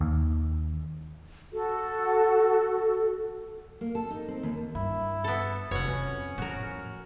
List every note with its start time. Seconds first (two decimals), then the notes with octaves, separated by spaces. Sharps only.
0.01 D#2
1.53 F#4 A4
3.81 A#3
3.95 A4
4.10 D#4
4.28 C4
4.43 D#2
4.75 G2 E4
5.24 B3 A4
5.71 F1 B2 C#5 F#5
5.88 F2 C#4
6.38 A2 F3 F#4 A#4